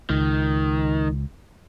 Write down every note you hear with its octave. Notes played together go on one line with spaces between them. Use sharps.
C#2 D#3